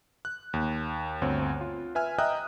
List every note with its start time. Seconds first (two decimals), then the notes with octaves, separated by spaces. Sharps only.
0.25 F#6
0.53 D#2
1.21 G1 D2 C4 C#5
1.61 F4
1.95 B4 E5 G#5 F6
2.18 D#5 E5 G5 A#5 D#6 F#6